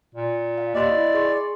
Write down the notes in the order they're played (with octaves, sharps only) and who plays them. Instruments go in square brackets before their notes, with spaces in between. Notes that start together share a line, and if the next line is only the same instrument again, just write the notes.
[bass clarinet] A#2
[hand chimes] F5
[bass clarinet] D#2 [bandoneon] D5 [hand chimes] D#5 C6
[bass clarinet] E4
[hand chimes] G#4 C6 C#6